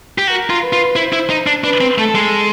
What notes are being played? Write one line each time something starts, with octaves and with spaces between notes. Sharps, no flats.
G4
F#4 A#4
F4
B4
F4
E4 C5
E4
D#4
D4
D4 B4
C4
A3 A4
G#3